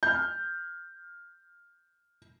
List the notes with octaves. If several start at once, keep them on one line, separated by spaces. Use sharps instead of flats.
F6 G6